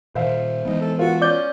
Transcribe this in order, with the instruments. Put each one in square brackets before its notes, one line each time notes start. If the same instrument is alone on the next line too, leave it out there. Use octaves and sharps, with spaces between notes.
[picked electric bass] A#2 D#3 [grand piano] C5 E5 F5
[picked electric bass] E3 G#3 B3 [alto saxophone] D#4
[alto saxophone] A4
[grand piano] F4 B4 [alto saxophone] F#4
[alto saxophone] C#4 [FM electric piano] D5 G6